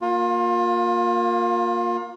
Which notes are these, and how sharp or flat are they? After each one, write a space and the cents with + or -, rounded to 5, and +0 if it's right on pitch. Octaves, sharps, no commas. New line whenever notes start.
A#3 +0 F4 +30